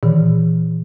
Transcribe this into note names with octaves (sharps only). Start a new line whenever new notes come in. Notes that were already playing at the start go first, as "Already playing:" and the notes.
A#2 D#3 E3